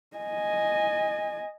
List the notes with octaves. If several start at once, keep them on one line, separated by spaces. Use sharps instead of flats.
D#5 G#5